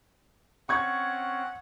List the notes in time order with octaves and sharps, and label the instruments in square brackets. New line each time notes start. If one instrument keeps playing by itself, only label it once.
[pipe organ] C4 C#4 [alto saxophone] F#5 [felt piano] C#6 G#6